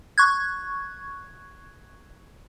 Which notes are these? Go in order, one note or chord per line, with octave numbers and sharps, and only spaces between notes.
C#6 F#6 G#6